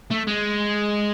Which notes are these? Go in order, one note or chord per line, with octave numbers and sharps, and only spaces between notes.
A3
G#3